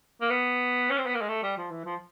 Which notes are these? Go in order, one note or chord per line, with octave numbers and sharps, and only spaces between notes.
A#3
B3
C#4
C4
B3
A#3
G#3
A3
G3
F3
E3
F3